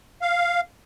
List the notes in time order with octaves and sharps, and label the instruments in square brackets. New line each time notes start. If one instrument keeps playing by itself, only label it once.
[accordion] F5